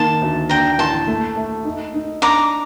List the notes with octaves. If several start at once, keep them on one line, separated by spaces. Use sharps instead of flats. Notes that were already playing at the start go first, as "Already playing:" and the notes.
Already playing: D#3 A#3 A5 C6
D2
D4 G5 A#5
A1 A5 C6
A3
A3
D#4
D#4
D4 A#5 D6